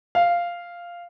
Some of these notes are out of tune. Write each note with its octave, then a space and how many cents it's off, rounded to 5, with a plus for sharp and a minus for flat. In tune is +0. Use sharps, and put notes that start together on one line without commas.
F5 -5